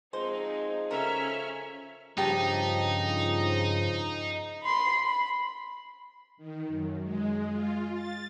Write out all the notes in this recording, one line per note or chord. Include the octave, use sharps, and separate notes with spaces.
F3 G#3 C4 D#4 C5
C#3 C#4 A4 A#4 E5 F6
G2 C#3 F3 D#4 G4 A5
B5 C6
B5
D#3
F#2
G#3
F4
A6